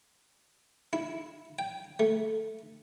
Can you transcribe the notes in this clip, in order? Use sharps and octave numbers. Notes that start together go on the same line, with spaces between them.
E4
G5
A3